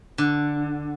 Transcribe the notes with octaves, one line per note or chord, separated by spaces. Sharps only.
D3